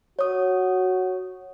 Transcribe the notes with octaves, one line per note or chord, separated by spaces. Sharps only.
F#4 C#5 D#6